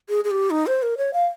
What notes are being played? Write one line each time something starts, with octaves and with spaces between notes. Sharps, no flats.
G#4
G#4
G4
D#4
C5
A#4
C#5
F5